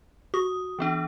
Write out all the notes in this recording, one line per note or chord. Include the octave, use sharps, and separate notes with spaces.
F#4 D#6
E3 B3 D4